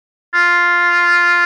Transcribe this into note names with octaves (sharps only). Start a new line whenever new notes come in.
F4